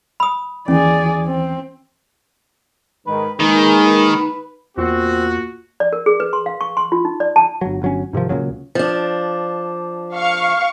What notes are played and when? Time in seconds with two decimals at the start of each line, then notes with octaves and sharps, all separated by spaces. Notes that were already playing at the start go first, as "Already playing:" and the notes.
0.20 B5 D#6
0.68 D#2 E3 C#4 G#4 D5
1.26 C4
3.07 G#2 D#3 B4
3.40 D#3 G#3 A#3 D#4 G#4 B4
4.78 E2 A#2 C4 F#4
5.80 D5
5.93 A#4
6.06 G#4
6.20 B4
6.33 C6
6.46 F5
6.61 C#6
6.77 C6
6.92 F4
7.05 D#4
7.20 D5
7.36 A5
7.61 G1 F#3
7.82 G1 F#3 C#4
8.13 G#2 C3 D#3 F3
8.29 C#2 A#2 C#3 F#3
8.75 F3 D4
10.15 F5 C#6